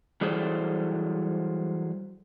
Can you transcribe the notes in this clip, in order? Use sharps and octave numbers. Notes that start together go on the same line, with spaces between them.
E3 F#3 G3 G#4 A4 C5